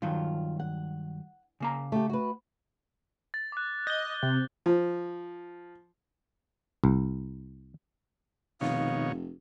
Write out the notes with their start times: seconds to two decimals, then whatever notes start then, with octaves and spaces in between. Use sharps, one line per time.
0.02 G2 D#3 F#3 F4
0.60 F#5
1.60 C#3 A#3 A#5
1.92 A3 G4
2.09 F#4 B4
3.34 A6
3.52 D6 F#6
3.87 D#5 G6 G7
4.22 C3
4.66 F3
6.84 C2
8.61 F1 B2 D#3 C#5 F5